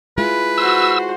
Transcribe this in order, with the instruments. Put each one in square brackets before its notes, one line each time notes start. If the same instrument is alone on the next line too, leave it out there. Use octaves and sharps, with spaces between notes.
[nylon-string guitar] G#3 E4 F4 [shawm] B4
[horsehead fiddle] F#4 C5 [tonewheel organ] E6